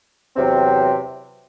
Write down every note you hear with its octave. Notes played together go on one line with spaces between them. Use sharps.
E2 C3 F#3 C4